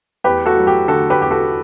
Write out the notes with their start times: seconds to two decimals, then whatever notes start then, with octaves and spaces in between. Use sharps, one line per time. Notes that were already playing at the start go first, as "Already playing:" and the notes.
0.24 E2 G4 B4
0.46 F#4 A4
0.57 F#3
0.67 G4
0.88 D3 F#4 A4
1.10 G4 B4
1.21 E2 G4
1.31 F#4 A4